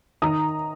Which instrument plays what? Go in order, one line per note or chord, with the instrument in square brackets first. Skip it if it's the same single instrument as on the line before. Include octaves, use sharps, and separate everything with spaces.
[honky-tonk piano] D#3 A#5 D#6